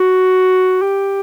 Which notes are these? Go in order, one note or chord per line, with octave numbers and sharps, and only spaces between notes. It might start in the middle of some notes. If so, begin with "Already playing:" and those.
Already playing: F#4
G4